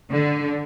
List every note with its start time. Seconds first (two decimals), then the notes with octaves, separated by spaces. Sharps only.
0.12 D3